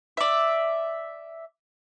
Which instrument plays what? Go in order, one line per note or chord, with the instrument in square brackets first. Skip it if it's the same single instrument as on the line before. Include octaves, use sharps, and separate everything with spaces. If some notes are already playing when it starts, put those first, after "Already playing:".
[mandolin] D5 E5